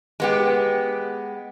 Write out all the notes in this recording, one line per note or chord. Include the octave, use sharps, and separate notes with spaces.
G#3 B3 G4